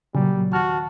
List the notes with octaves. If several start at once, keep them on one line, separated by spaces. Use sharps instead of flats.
A#2 C#3 F#3 G3
D#2 F#4 A5 F6